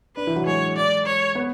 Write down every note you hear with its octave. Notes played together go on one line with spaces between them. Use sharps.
D4 B4
E3 E4
F#3 F#4
G#3 G#4 C#5
D5
C#5
B3 B4